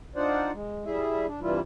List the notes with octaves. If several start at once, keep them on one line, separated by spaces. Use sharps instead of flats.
D4 D#4 F4 C5 D5 F#5
G#3
G3 E4 G#4 E5
D4
G2 C3 E3 G3 E4 F4